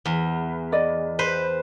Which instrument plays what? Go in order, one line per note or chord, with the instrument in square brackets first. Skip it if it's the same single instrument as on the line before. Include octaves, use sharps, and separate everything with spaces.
[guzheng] E2
[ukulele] D5 D#5
[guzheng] B4 C5